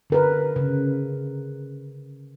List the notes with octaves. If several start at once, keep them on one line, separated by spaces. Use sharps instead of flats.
D3 A#4 B4
C#3